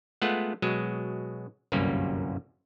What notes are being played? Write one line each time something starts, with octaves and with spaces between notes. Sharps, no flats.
G#3 A3 B3 F4 F#5
B2 F#3 G#3
G1 C2 F#2 G3 A#3 C#4